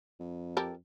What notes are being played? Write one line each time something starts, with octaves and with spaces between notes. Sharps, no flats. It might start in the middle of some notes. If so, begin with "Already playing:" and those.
F2
G4 A4 A#4